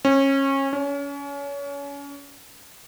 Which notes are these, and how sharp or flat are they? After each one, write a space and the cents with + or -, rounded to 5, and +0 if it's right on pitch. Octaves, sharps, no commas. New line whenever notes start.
C#4 -25
C#4 +30